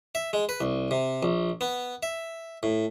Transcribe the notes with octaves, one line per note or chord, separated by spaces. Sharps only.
E5
G#3
B4
C2
C3
A#1
B3
E5
A2